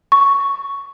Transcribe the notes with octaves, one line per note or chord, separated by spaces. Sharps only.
C#6